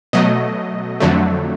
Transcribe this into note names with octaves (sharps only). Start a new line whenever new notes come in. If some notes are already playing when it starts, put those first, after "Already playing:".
B2 F#3 A3 D#5
F2 D3 F#3 A3